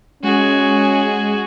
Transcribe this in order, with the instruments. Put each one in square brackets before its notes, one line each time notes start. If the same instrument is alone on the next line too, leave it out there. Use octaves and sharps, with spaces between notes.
[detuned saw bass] G#3 [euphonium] C#4 [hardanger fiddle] F#4 G#4